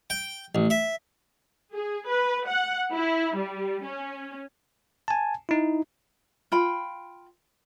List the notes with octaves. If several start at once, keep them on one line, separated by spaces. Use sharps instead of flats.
G5
A1
E5
G#4
B4
F#5
E4
G3
C#4
G#5 A5
D#4 E4
F4 G5 B5